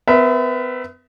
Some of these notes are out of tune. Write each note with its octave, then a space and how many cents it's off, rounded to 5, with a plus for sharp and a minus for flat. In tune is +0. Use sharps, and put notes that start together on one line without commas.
B3 +40 B4 -45 E5 +0